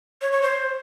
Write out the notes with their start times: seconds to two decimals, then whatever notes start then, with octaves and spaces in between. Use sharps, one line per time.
0.21 C#5
0.32 C#5
0.42 C5